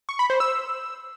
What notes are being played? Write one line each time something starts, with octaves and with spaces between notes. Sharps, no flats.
C#6
B5
C5
E6